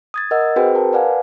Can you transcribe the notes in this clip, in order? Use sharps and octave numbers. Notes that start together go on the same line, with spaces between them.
D#6 G#6 A6
A#4 D#5 F#5 E6
C4 F#4 G#4 B4 C5 G5
A#4 A5
B4 D5 F5 F#5 G#5